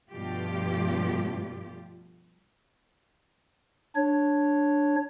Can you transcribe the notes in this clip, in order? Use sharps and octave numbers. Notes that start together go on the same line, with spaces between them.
G2 B2 F3 A3 F4 G4
D4 C#5